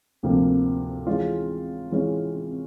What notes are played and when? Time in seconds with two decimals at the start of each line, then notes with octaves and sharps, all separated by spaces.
0.23 D2 C3 F3 A#3
1.07 E3 G#3 C#4 F4
1.92 E3 G#3 C#4 F4